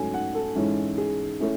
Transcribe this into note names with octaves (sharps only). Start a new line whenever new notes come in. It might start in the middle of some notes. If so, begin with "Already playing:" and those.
Already playing: G#2 F#3 A3 C#4 G#5
F#5
A4
G#2 E3 G#3 C#4 E4
G#4
A3 C#4 E4